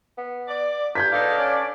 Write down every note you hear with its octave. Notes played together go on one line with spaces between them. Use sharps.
B3
D5
G2 G6 G#6 B6
E2 D4 D#4 A4 F5
C#4 D5